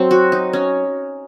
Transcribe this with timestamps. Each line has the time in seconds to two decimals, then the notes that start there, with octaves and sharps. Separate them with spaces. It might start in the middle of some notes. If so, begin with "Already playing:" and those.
Already playing: F#3 C4
0.11 F#4
0.32 D#4
0.53 C#4